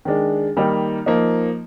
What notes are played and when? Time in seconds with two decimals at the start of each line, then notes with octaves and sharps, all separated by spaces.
0.05 D#3 G#3 D4
0.57 D#3 G3 A#3 D#4
1.06 F3 A#3 D#4